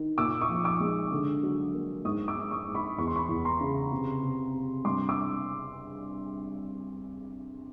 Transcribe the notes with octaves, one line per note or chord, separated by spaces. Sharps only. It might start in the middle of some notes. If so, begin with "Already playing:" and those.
Already playing: D#3
A#2 D6 E6
C#6 D#6
F3
D6 E6
G#3
D3
F#3
A#3
G#2 C#6 D#6
D6 E6
G#2
C#6 D#6
G#2
B5 C#6
E2 C#6
C6
B5 C#6
E2
A#5 C6
C#3
C3
C3
C3
G2 C6 D6
D6 E6